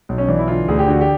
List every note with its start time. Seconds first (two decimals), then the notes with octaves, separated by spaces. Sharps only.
0.09 B1
0.18 C#4
0.28 E3 D4
0.38 E4
0.48 D3 F4
0.68 D2 G#4
0.79 G4
0.87 D3 F#4
1.01 G4